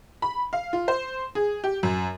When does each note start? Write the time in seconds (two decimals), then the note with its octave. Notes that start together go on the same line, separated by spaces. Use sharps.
0.22 B5
0.53 F5
0.73 F4
0.88 C5
1.35 G#4
1.64 G4
1.83 F#2